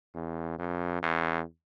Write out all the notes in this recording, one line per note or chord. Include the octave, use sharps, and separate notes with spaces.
E2
F2
E2